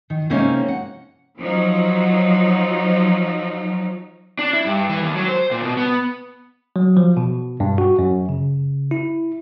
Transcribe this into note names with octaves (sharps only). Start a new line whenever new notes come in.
D#3
C3 G#3 A#3 C4 C#4 D#4
F#5
F3 F#3 D#4
D4
E4
G2
E3
D#2
F#3
C5
A#2
B2
B3
F#3
F3
B2
G2
F#4
F#2
C#3
E4